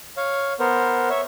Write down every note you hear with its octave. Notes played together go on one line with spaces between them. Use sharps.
C#5 F5
B3 A#4 C5
C#5 E5